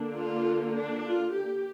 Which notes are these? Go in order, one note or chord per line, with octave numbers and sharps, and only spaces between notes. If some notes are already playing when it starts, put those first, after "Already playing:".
Already playing: D3 A#3 D4
F4
D4
F4
G4